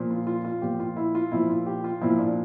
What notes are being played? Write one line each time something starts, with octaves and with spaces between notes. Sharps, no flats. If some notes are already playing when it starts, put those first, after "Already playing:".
Already playing: A#2 F3
F4
F4
F4
A#2 F3 G4
F4
E4
F4
A#2 F3 E4
F4
G4
F4
A#2 F3 E4
D4